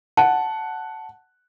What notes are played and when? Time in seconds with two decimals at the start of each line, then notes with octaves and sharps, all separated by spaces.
0.17 F#5 A5